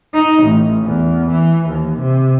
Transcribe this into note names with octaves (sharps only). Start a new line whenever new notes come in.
D#4
A1
E2
E3
D#2
C3